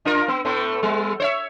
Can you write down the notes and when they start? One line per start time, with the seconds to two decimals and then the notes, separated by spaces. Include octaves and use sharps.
0.05 D4 F4 A#4
0.28 B3
0.45 A2 A3 B3
0.83 G3 B3
1.20 C5 C#5 E5